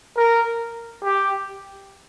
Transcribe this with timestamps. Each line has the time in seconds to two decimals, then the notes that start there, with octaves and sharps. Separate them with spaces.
0.17 A#4
1.04 G4